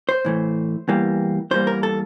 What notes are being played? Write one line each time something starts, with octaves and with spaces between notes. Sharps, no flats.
C5
A2 E3 A3
E2 E3 G3 A#3
E2 E3 G3 A#3 C5
A#4
A4